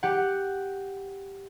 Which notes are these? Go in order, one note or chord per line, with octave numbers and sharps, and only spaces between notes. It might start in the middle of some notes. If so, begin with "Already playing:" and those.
G4 F#5